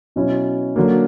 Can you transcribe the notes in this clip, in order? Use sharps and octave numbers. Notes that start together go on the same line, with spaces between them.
B2 F#3 C#4 E4
D3 F#3 A#3